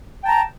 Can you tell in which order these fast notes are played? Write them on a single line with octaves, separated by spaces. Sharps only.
G5 A5 A#5